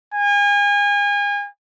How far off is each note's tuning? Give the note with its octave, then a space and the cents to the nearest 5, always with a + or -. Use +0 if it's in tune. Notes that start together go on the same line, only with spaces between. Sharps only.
G#5 -35